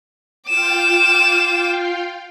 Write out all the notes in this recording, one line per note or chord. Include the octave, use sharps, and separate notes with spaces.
F4 F5 G5 D6 E7